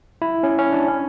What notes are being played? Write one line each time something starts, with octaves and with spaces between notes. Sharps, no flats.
E4
C#4
C#4
D4
C#4